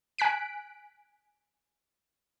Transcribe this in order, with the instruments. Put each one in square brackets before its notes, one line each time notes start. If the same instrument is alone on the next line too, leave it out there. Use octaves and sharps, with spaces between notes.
[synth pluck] G#5 F#6 B6 D7